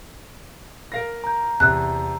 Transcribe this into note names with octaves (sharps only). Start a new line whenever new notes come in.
A#4 F5 A#6
A#5 G6
E2 C3 A5 A#5 E6 F#6